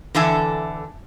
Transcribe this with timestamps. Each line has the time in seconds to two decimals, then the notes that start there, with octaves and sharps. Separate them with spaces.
0.15 D3 E3 A4 E5 G#5